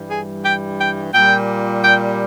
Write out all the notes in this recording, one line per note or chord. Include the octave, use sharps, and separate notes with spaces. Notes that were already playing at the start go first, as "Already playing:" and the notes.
Already playing: G2 E3 G3
G#4
G5
G5
A#2 G3 G5
G5